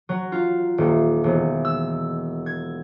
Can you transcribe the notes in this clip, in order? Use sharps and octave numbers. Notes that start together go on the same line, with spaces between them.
F#3
F4
D#1
E1
E6
G#6